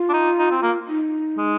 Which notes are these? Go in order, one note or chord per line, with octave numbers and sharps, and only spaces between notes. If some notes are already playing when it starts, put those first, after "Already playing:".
Already playing: F4
D4
D#4
D#4
C4
A#3
D#4
G#3